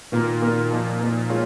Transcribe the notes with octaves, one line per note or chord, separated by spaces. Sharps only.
A#2 D#3 A#3 F4 A#4
D#3 A#3 F4 A#4
F3 A#3 D#4
F3 A#3 D#4
G#3 F4 C#5